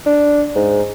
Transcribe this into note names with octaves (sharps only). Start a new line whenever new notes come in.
D4
G#2